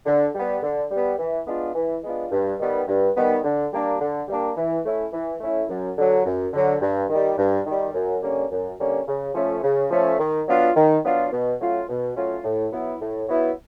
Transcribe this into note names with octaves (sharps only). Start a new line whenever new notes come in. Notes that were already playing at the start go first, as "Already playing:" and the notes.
D3
G3 B3
D3
G3 B3
E3
G#3 B3 D4 F4
E3
G#3 B3 D4 F4
G2
D#3 G3 B3
G2
D#3 G3 B3
D3
G3 A#3 D4
D3
G3 A#3 D4
E3
A3 C#4 E4
E3
A3 C#4 E4
F#2
D3 F#3
F#2
D3 F#3
G2
D#3 G3
G2
D#3 G3
F#2
D3 G3 A#3 C#4
F#2
D3 G3 A#3 C#4
C#3
F3 A3 C#4
C#3
F3 A3 C#4
D#3
F#3 B3 D4 F4
D#3
F#3 B3 D4 F4
B2
F#3 A3 C#4 F4
B2
F#3 A3 C#4 F4
A2
F#3 B3 E4
A2
F#3 B3 E4